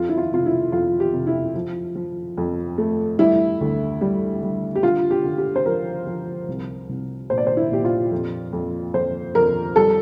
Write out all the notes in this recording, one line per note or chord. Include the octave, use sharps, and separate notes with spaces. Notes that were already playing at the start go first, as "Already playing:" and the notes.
Already playing: F2 F4
E4
F4
C3 F4
E4
F2 F4
G4
C3
E4
F3
F3
F2
A3
G3 E4
D2
G3
G3
G4
D3 F4
G4
D3
G4
C5
F3 A#4
F3
C2
C2
A#2 C5
D5
C5
E4
A#2 G4
F4
F2
F2
F2 C5
F2 A#4
G3 A4